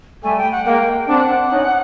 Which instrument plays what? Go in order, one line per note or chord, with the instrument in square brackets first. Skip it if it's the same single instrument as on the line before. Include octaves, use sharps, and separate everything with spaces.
[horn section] G3 A3 [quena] G#5
[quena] G5
F#5
[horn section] G#3 A#3 [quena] G5
[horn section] C4 D4 [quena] F#5
[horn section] C#4 D#4